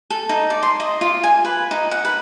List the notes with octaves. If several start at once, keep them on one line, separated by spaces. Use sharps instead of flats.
A4
D#4
D5
C6
D#5
F4
G#5
B4
D#4
F#5
B4